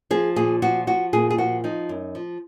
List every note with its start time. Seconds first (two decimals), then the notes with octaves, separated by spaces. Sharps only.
0.11 F3 G#4
0.36 A#2 G#4
0.62 F3 F#4
0.87 F3 F#4
1.13 A#2 G#4
1.30 G#4
1.38 F3 F#4
1.64 F3 D#4
1.89 F#2
2.15 F3